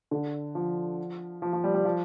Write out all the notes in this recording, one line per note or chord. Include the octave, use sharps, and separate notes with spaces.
D3
F3
F3
F3
G3
G3
F3